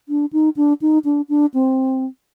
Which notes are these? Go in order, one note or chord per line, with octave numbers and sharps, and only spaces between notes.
D4
D#4
D4
D#4
D4
D4
C4